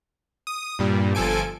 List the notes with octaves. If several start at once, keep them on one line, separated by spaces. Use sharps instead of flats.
D#6
G2 A#2 G3
G1 F3 A4 G#5 D7